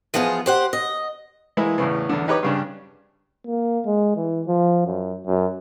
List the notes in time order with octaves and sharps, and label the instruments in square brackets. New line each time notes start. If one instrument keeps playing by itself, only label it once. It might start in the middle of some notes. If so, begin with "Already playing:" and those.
[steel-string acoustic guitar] E3 F3 B3 F4 G#4
G4 C5 F#5
D#5
[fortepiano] E3 G#3 A#3 E4
E2 A2 C#3 E3
E2 D3
D#4 G4 B4 C#5 A#5 D6
G2 C#3 D4
[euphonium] A#3
G#3
E3
F3
F#2
F#2